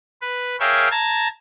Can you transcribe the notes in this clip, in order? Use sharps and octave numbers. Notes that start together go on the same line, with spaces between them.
B4
G#4 A#4 C#5 E5 F5 G5
A5 A#5 G#6 A6